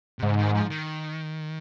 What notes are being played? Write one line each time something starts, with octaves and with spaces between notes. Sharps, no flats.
C3
G#2 C#3
D#3
F3
D#3